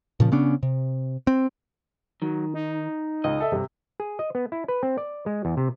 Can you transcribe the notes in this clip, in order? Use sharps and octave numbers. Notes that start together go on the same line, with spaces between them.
A#2 C#3 F3
C#3 B3 C#4 D4
C3
C4
D#3 F#3
D#4
C#2 D#5
A4 E5
G2 C3
G#4
D#5
B3
E4
B4
C4
D5
G#3
E2
C3